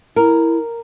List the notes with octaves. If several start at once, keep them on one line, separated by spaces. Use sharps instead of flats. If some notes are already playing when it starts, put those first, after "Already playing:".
E4 A#4